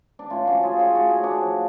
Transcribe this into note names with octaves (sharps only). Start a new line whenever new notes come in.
D4
A2 C#4 F4
F3 D4 F#4
F4 G#4
F3
F4 G#4
A2 F#4
G#4
A2
D4 F#4
F3